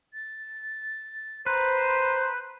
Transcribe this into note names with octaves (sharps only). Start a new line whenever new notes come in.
A6
B4 C5 A#5